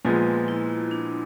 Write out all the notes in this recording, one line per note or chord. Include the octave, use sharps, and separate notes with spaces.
A#2 F3 G#3 B3 F4
E4
D4